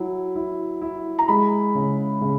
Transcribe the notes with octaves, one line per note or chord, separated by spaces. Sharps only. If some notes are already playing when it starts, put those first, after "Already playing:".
Already playing: F#3 E4
E4
E4
A#5
G#3 B5
C#3
C#3